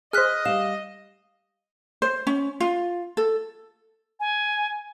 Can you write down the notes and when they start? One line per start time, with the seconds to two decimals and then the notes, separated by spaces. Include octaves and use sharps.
0.13 G#4 C5 D#5 F6 F#6 B6
0.45 G3 F5 E7
2.02 C5
2.27 C#4
2.60 F4
3.17 A4
4.20 G#5